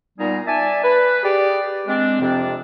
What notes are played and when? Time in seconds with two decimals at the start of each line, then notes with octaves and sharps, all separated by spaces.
0.19 A#2 G3 B3 D#4 G#4 A#5
0.47 D5 E5 G#5 A5
0.83 B4
1.23 G4 G#4 D5
1.87 G#3 C4 D4
2.20 F2 C3 F3 C4 D4